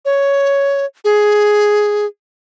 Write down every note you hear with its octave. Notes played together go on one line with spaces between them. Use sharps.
C#5
G#4